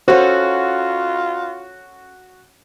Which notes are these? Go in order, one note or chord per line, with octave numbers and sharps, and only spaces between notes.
C#4 F4 F#4 A4 C5